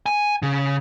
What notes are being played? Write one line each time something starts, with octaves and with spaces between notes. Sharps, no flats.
G#5
C#3